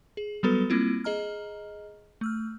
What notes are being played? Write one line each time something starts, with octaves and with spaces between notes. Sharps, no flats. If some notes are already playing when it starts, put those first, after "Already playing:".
G#4
F#3 G3 B3 F#4 A4 B4
G3 A#3 C4 E4 F4
G#4 D#5 A#5 F6
A3 E6 F6